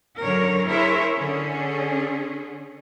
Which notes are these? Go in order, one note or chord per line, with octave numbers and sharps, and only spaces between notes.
F#2 D3 A#4 C#5
E4 G#4 A#4 C5 C#5 E5
D3 C#4 G#4